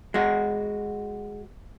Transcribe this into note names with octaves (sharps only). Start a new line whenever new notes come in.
G#3 F#4